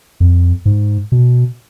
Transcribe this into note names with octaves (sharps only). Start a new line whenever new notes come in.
F2
G#2
B2